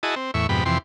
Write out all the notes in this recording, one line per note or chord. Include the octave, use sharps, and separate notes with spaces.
E4 F#4 G#4 D#5 A5
C4
E2 A2 E5 C#6
F2 G#2 B2 G4 B5
F2 C3 E3 G4 C6